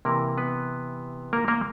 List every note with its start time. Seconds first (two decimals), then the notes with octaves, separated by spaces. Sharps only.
0.05 C3 E3 A#3 A#4
0.38 B3 B4
1.33 A#3 A#4
1.48 A#3 A#4